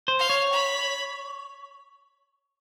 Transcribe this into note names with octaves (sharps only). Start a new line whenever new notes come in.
C5
F5
C#5
B5